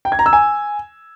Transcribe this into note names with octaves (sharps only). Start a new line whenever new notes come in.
G5
G#6
A#5
E6
G#5